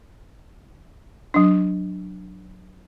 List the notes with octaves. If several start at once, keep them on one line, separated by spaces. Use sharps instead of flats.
F#3 D4